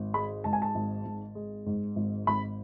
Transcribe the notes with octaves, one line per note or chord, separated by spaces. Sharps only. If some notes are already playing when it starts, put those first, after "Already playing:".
Already playing: G#1
G#3 B5
G#2 A5
G#5
A5
G#1
G#1
G#3
G#2
G#1
G#1 B5